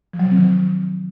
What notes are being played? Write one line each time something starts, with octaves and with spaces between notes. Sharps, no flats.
F3
F#3
C3
C4
D#3